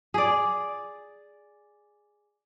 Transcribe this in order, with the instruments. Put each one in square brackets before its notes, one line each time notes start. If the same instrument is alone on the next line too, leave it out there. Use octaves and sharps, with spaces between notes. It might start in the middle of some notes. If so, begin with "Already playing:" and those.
[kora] G#4 D5